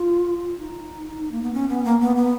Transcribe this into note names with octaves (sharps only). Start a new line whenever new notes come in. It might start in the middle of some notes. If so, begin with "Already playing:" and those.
Already playing: F4
D#4
A#3
B3
C#4
B3
A#3
B3
B3